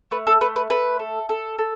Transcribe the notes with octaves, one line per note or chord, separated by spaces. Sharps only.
A3 B4
A4
A3 B4
B4
A3 B4
A4
A4
A4